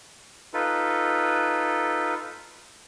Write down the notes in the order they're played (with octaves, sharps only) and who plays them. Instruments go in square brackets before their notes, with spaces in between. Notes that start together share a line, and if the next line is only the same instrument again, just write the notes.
[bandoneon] D#4 F4 A4 B4